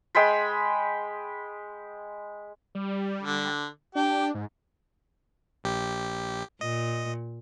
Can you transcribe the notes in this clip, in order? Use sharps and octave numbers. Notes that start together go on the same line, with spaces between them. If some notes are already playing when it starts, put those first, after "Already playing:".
G#3 G5 B5 C6
G3
D3
D4 G4
G#2
A#1 G4
A#2 D#5